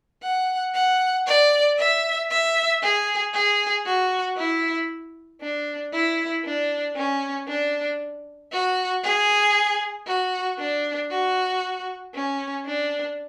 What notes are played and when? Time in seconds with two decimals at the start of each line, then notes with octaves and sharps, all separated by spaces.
0.23 F#5
0.74 F#5
1.26 D5
1.78 E5
2.30 E5
2.82 G#4
3.34 G#4
3.85 F#4
4.37 E4
5.41 D4
5.93 E4
6.45 D4
6.96 C#4
7.48 D4
8.52 F#4
9.04 G#4
10.07 F#4
10.59 D4
11.11 F#4
12.15 C#4
12.66 D4